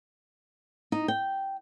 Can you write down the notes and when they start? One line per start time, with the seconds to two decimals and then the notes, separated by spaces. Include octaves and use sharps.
0.92 D#4
1.08 G5